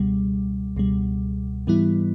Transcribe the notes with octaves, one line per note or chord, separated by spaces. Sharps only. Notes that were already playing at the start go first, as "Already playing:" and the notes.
Already playing: C#2 B2 G3
C#2 B2 G3
G#2 E3 G3 B3 E4